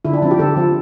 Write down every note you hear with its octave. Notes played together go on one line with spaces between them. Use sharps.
D3 E4
D4
F3 C4 E4
G4
D3 A4
F3 C4